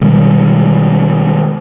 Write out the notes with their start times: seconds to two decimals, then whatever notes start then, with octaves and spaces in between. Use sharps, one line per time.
0.01 B2 D#3 G3 G#3